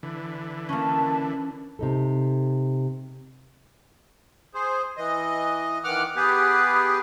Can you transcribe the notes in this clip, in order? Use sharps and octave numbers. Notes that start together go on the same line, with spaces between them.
D3 E3
A#3 C#4 A5
C3 D#4 A4
G#4 C5
E3 D#5
D#3 E3 F#5 D6 F6
B3 G4 G#4 B4